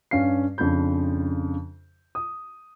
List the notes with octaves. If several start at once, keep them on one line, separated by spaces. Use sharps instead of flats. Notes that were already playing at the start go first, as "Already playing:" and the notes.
G2 C#4 F5 C7
F2 C#3 D4 B5 G6
D#6